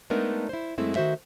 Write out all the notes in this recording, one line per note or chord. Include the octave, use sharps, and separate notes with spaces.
G#3 A3 B3 D4 D#4 A#4
E4 C5
F#2 G#3 A3 C4 E4
D#3 F#4 C5 E5